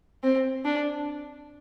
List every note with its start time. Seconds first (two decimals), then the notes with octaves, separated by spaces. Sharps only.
0.23 C4
0.65 D4